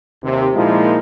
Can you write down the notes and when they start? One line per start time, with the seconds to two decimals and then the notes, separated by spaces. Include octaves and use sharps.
0.23 D#2 C3
0.54 A#2 F3 G#3 A#3 D#4 E4